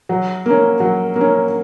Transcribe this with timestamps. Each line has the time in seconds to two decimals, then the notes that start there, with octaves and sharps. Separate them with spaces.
0.09 F#3
0.46 A#3 C#4
0.80 F#3
1.16 A#3
1.21 C#4